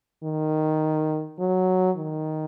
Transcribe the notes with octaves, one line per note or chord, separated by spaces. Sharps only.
D#3
F#3
D#3